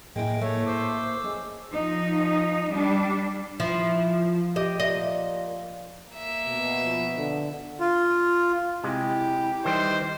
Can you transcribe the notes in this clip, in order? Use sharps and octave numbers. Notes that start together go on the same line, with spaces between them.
A2 G#3 A#3 E4 G5
A3 A#3 C#5
C5 D6 E6
G#3 C#4
F3 D#4
G3 D4
F3 E4
G4 D#5
A#2 D#5
A#3 E5
B2
F3
D3
F4
C3 G#3 E4 G4
D#3 E3 G3 C5 D#5